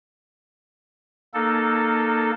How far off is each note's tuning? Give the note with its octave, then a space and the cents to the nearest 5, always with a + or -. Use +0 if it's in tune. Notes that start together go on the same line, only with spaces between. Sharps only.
A#3 +0 D#4 -25 A4 +0